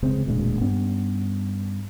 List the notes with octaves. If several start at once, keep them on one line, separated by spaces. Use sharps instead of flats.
F1 C#2 C#3 C4
E1 D2 A#2 G#3
G2 B3 C#4